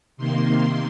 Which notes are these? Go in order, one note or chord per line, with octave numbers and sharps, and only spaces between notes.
C3 D#3 A#3 C6